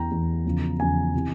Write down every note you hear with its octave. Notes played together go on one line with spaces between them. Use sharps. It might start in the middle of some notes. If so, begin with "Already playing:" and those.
Already playing: E2 E3 G5 A#5
E2 E3
E2 C#3 F3
E2 C#3 F3 G#5
C3 E3